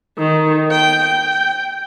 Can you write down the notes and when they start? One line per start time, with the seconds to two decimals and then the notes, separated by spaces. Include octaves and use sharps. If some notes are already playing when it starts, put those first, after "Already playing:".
0.19 D#3
0.71 G5
1.04 G5